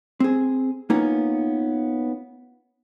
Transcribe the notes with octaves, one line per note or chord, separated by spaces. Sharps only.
C4 G#4
A#3 B3 C#4 D#4 F4